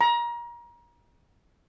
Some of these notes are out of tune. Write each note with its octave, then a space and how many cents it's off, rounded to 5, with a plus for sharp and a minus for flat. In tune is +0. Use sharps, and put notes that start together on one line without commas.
A#5 +30